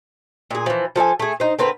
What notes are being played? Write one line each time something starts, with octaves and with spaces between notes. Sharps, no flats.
A#2 G#4
E3 F3
F3 A4 D5 G#5
A3 G#4
D#4 C5
D3 C4 A#4 B4